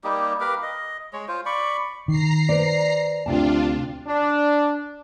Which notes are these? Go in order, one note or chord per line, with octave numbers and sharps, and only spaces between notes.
G3 A#3 D#4 G4
G4 A#4 B4 F5
D#5
G#3 C#5
F4 C5
D5 B5 C#6
D#3 A#5 C7
B4 C5 D5
D2 C3 D4 F4 A5
D4